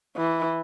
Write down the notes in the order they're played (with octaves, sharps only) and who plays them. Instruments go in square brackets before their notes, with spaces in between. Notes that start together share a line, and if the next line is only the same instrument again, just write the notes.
[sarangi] E3